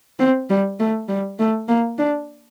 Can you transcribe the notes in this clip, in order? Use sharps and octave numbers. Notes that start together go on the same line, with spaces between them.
C4
G3
A3
G3
A3
A#3
D4